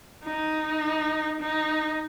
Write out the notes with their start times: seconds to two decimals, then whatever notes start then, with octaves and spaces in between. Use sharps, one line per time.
0.25 D#4
1.41 D#4